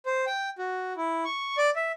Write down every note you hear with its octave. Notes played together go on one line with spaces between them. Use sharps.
C5
G5
F#4
E4
C#6
D5
E5